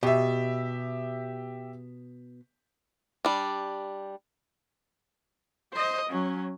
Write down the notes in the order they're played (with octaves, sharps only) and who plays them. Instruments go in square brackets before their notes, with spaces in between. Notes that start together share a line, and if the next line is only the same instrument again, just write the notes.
[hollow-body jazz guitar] B2 [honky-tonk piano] G4 E5
[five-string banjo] G3 D4
[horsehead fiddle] C5 D#5
F#3 C#4